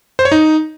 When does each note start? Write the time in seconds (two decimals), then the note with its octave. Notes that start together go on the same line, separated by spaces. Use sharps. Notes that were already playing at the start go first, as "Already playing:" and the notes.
0.19 C5
0.25 C#5
0.32 D#4